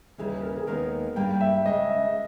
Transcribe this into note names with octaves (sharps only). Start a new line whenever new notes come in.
D#2 C#3 E3 G3 C#4 G#4
A#4
G#4
D#2 D#3 G#3 B3 A#4
G2 G3 A#3 G5
G5
E5
C#3 G#3 C#4 D#5
E5